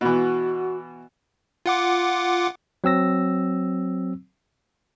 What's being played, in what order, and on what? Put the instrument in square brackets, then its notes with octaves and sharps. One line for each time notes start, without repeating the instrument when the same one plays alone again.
[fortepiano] B2 E3 [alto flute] F#4
[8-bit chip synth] F4 F#5 D6
[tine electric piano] F#3 C4 E6 A#6